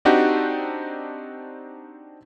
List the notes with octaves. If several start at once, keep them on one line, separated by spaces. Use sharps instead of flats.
C4 D4 D#4 F#4 G4